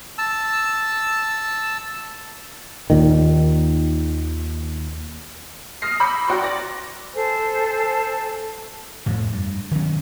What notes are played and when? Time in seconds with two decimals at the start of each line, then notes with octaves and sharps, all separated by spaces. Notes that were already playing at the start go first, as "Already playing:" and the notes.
0.18 A5 E6
2.90 D#2 A#2 D#3
5.82 D#6 F6 A#6 C7
6.00 B5 D6 E6 G6 C#7
6.28 F#4 D5 G5 A#5 C6
6.43 D5 A#6
7.14 A4 C5 G#5
9.06 F2 A2
9.33 G2
9.71 D#3 F3 F#3 C#4